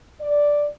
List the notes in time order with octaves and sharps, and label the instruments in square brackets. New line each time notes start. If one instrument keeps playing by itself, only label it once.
[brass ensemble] D5